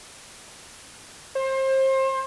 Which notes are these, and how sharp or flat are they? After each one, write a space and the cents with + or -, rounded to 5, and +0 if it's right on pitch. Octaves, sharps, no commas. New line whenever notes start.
C5 +30